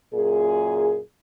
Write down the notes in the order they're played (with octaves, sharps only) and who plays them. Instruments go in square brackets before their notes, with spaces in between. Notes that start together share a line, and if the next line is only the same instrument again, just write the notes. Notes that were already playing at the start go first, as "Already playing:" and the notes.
[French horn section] F#2 A#2 G#4